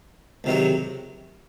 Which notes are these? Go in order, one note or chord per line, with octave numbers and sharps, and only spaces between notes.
C#2 C3 D#3 F#3